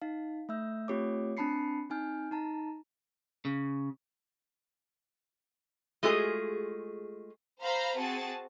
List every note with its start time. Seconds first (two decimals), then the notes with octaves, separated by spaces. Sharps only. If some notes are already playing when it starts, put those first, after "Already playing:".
0.02 D#4 F5
0.49 A3 E5 E6 G6
0.88 A3 C4 F4 G4 C#5 D6
1.37 C4 D4 A5 B5 C7 C#7
1.90 C4 D#4 G#5 F6 G6
2.31 D#4 A5 A#5
3.45 C#3
6.03 G#3 A3 F4 F#4 G#4
7.63 C5 F5 A#5 B5
7.98 C4 F#4 G#4 A5